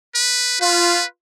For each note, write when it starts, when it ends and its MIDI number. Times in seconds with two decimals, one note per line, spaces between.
0.15 0.60 71
0.61 1.00 65
0.61 1.05 71